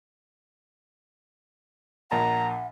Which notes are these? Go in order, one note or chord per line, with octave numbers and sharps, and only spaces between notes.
A#1 A#2 F#5 A5 A#5